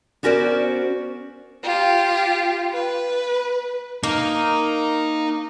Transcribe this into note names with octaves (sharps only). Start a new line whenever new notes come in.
B3 C#4 F#4 A#4 C5 D5
F4 G4
B4
A#3 D#4